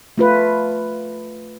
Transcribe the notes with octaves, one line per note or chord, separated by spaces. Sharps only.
A3 F4 B4